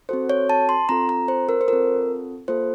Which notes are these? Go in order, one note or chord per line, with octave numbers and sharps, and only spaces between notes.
C4 F#4 A4 C5
C#5
A5
C6
C4 F4 A4 A#5
A#5
C5
A#4
C5
C4 F4 A4 A#4
A#3 F4 A4 C5